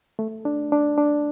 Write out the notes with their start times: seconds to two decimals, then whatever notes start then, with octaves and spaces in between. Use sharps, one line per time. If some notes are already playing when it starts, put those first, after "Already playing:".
0.19 A3
0.45 D4
0.72 D4
0.98 D4